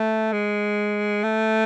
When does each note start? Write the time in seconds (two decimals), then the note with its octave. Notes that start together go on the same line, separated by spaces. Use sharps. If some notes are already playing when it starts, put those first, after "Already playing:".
Already playing: A3
0.32 G#3
1.23 A3